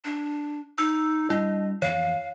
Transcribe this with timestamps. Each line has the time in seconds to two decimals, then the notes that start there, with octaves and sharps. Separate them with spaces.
0.05 D4
0.78 D#4 E6
1.30 G3 D4 E4 D#5
1.82 F2 E3 C#5 F5